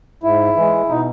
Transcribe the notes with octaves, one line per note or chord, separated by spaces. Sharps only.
G#2 E4
E3 G#3
B2 D#4